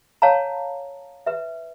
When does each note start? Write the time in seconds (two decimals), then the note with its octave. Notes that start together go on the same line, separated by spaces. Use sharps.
0.22 C#5 F5 A5 A#5
1.26 B4 E5